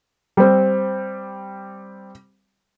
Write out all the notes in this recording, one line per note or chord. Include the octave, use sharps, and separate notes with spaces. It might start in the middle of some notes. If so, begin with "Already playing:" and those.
G3 C4